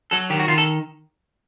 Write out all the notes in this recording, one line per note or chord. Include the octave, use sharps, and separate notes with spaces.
F#3 A4
D#3 G4
F#4
D#3 F4
A4